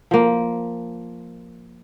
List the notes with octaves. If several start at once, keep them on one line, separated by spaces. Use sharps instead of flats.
F3 A#3